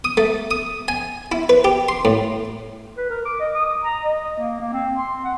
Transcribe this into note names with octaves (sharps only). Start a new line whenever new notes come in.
D#6
A3
D#6
G#5
E4
B4
G4
C6
A2
B4
A#4
D6
D#5
D#6
A#5
D#5
A#3
A#3
C4
C6
F#5